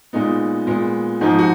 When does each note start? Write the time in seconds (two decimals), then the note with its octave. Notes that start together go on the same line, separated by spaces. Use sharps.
0.13 A#2 G#3 B3 D#4
0.67 A#2 G#3 B3
1.21 G#2 F3 G#3 D#4
1.39 F#4